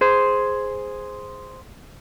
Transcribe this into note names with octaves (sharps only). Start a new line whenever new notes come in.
G#4 C5